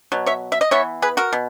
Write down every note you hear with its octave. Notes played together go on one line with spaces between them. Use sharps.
B2 F#3
C#5 E5
E5
D#5
E3 B3 C#5 E5
G#4 B4
F#4 A#4
B2